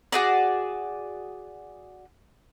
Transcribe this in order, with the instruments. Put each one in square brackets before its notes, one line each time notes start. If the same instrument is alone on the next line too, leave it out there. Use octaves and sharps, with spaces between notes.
[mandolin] F#4 G#4 D5